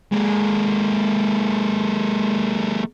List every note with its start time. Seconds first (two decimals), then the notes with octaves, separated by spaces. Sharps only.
0.12 G#3 A#3